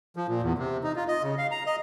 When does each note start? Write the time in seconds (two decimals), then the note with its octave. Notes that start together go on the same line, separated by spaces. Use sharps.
0.16 F3
0.28 A#2
0.42 E2
0.58 C3
0.84 D#4
0.96 F4
1.08 D#5
1.23 C#3
1.38 F5
1.51 A#5
1.66 D#5